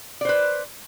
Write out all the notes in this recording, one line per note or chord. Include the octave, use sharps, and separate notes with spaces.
B4 C5 D5